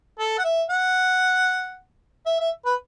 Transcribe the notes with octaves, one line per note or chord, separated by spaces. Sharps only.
A4
F#5
E5
F#5
E5
E5
B4